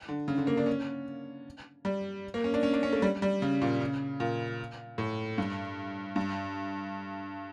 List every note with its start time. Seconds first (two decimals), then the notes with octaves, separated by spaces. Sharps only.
0.09 D3
0.28 C#3
0.38 D3
0.47 A#3
0.57 D4
0.67 C#4
1.85 G3
2.34 A#3
2.44 C#4
2.54 D4
2.63 C#4
2.74 D4
2.83 C#4
2.93 A3
3.02 G3
3.22 G3
3.42 C#3
3.62 A#2
3.80 C#3
4.20 A#2
4.98 A2
5.38 G2
6.16 G2